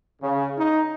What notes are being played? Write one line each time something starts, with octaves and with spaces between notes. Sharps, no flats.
C#3
D#4